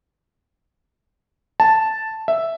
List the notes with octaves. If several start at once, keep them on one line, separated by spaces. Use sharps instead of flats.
A5
E5